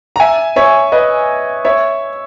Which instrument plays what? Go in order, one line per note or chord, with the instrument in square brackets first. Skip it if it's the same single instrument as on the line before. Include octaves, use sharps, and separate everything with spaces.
[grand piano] A#5
E5 G#5
C#5 E5
B4 D#5
C#5 E5